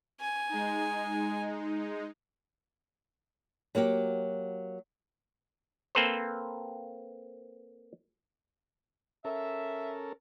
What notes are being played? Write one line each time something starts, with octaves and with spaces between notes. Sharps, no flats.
G#5
G#3 D#4
F#3 A#3 F#4 G4
A#3 C4 A4 B4 C5
C#4 A4 A#4 E5